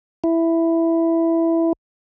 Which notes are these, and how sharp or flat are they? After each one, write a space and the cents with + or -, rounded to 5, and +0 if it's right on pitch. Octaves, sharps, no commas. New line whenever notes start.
E4 +5